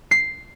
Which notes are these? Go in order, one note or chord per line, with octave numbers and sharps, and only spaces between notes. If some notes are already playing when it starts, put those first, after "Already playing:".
C7